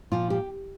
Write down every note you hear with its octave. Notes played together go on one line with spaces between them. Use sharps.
A#2 F3 F4
G4